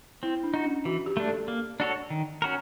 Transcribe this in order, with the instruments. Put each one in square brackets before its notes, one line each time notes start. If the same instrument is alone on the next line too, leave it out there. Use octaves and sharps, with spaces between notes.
[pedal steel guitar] C4 [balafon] E4
[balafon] D4
[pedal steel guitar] D#4 F#4
[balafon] C#4
[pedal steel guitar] E3 [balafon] F#4
[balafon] G4
[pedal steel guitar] A3 D4
[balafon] A4
[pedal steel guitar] A#3
D4 F#4 A4 C#5
D#3
C#4 F#4 A#4